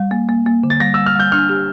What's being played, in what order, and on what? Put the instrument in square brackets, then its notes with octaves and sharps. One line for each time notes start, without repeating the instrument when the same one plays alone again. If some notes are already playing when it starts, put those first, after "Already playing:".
Already playing: [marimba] G3
A#3
A#3
A#3
D3
[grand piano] A6
[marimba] G3 [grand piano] A#6
[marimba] G3 [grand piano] E6
[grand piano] F6
[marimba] G3 [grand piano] G6
[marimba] D4 [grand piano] F6
[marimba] G4